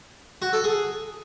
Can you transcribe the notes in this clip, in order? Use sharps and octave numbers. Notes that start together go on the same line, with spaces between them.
F#4
A4
G#4